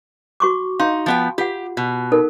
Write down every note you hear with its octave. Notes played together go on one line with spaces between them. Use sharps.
F#4 C#6 D6
D#4 F5 C6
F3 B3 G5
F4 G4 F#5
B2
D#4 A4 A#4